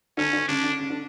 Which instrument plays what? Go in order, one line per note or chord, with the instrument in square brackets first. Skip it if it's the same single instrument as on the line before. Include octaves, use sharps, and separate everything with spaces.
[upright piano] D3 [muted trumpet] C#4
[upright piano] D3
[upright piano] C#3 [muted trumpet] D4
[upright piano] D3
C#3
D3